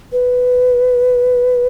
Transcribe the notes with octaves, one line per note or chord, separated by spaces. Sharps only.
B4